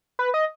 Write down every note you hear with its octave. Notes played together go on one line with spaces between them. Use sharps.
B4
D#5